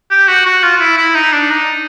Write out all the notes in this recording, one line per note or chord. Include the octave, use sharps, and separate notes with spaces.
G4
F#4
F#4
F4
F4
E4
E4
D#4
D4
D#4